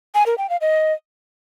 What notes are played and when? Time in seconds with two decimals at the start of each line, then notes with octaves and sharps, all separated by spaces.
0.15 G#5
0.26 A#4
0.38 G5
0.50 F5
0.61 D#5